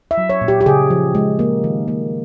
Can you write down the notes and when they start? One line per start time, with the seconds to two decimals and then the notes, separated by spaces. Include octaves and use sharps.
0.11 E5
0.17 F#3
0.30 C#5
0.41 A#2
0.48 G4
0.61 G4
0.66 C#3 G#4
0.90 F3
1.15 G#3
1.39 A#3
1.64 D#3
1.88 A#3